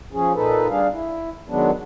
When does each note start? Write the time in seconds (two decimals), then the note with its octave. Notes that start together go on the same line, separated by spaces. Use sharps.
0.13 F3 C#4 G#4
0.35 A#2 D#4 A4 B4
0.70 G3 D4 G#4 F5
0.92 E4
1.49 D#3 F#3 G#3 B3 D4